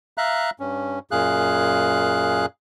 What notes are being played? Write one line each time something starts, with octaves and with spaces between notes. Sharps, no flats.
E5 F5 A#5 F#6
G2 C#4
F#2 A#2 G#4 F5 F#6